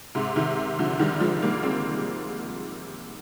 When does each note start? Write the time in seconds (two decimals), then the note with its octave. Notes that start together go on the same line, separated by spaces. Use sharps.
0.15 G#2 C3
0.36 C3 D#3
0.79 D3 F3
0.99 D#3 G3
1.20 F3 G#3
1.42 G3 A#3
1.63 G#3 C4